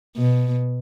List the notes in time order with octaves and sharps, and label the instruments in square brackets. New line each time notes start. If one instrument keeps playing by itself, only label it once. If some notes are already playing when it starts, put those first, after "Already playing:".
[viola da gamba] B2